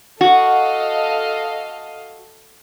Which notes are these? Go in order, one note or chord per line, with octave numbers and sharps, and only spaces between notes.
F#4 A4 D#5 F5